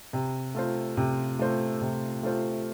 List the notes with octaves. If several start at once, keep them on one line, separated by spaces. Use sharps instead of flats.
C3
A3 F4 C5
C3
A3 F4 C5
C3
A3 F4 C5